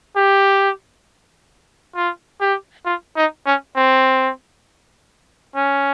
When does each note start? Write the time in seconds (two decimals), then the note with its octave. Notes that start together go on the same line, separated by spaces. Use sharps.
0.16 G4
1.96 F4
2.41 G4
2.85 F4
3.17 D#4
3.46 C#4
3.76 C4
5.56 C#4